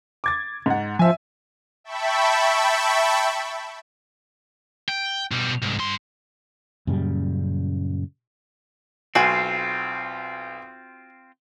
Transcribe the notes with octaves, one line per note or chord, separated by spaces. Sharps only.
D6 G#6 A6
G#2 F#5
F3 E5 G#5
E5 G5 A5 B5 C#6
G5
B2 G3
C2 G#2
G2 C6
F#2 A#2 C#3 G3
B1 C4 F4 F#4 G#5